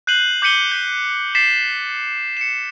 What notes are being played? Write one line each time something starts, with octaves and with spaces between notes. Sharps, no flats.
F#6 G6 C7 D#7 F#7
D6 G6 B6 C#7 D#7 G7
G6 B6 D#7
A6 B6 C7 E7
C#7 E7